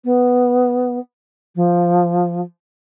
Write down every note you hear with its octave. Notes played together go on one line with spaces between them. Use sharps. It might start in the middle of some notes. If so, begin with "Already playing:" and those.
B3
F3